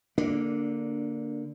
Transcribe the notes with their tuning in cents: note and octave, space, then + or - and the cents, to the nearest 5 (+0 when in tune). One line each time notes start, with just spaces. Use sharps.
D3 -20 A#3 +0 D4 +0